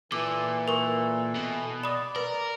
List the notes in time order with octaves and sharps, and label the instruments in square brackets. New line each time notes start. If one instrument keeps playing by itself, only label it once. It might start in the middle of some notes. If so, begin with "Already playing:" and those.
[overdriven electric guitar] A#2 [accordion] E3 A4 [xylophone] D6
[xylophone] A#4 C#6
[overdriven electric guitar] B2
[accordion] D5 [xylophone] B5 D#6
[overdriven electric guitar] A#4 [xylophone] B4